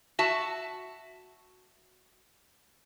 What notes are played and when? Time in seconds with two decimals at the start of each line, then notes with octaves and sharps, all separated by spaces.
0.19 F#4 E5 A5